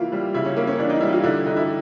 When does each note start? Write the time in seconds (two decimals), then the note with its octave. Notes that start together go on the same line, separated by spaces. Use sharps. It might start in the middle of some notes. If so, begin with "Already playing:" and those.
Already playing: C#3 E3 A#3 E4 F4
0.12 G3
0.34 C#3 E4
0.45 C#4
0.56 A#3 C#4
0.67 C#4
0.79 E3 D4
0.90 D#4
1.01 G3 E4
1.13 F4
1.24 D3 E4
1.46 D3 D#4
1.56 E4